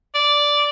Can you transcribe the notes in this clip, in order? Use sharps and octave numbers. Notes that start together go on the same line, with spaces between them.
D5